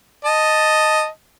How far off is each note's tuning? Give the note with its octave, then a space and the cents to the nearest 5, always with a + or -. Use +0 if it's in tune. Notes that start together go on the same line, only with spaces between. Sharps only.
D#5 +0 A5 +0